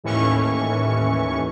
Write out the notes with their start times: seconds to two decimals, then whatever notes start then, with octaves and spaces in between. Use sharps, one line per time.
0.04 D#2 A2 E3 C#4 C#6